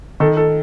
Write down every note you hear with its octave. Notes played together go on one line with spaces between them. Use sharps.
D#3 A4
A4